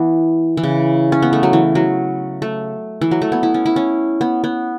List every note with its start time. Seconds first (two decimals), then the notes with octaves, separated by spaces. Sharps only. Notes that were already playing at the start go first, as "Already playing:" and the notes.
Already playing: E3 B3
0.57 E3
0.63 C#3
1.12 C#4
1.22 B3
1.33 A3
1.43 F#3
1.53 E3
1.75 F#3
2.42 A3
3.01 E3
3.11 F#3
3.22 A3
3.32 B3
3.43 E4
3.54 C#4
3.66 E4
3.76 C#4
4.21 B3
4.44 B3